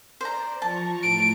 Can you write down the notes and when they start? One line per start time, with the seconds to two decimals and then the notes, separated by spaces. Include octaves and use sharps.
0.21 C5 D5 A#5
0.62 F3 A5 A#5 C#6
1.03 A2 D7